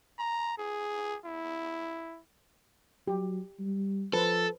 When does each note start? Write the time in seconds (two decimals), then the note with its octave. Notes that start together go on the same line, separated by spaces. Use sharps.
0.19 A#5
0.57 G#4
1.25 E4
3.08 F#3 G4
3.60 G3
4.13 F3 A4 B4 C5